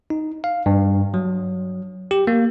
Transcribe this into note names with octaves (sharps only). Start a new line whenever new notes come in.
D#4
F5
G2
F#3
G4
A#3